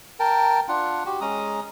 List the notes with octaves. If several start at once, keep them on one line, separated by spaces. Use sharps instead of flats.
A#4 G5 A5
D4 F4 F#5
F#4 G4
G#3 C#4 A#5 D#6